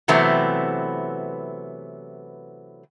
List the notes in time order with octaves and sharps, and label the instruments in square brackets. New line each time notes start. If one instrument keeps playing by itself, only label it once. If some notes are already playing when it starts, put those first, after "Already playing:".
[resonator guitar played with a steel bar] C3 E3 F#3 A3 B3 C4